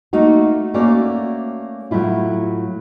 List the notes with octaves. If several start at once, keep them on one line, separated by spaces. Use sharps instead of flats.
A3 A#3 D#4 F#4
A3 A#3 C#4 F#4 D5
A2 F#3 A3 E4 F4